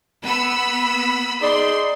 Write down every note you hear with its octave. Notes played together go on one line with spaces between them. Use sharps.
B3 B5 E6
D#4 G#4 D5 C6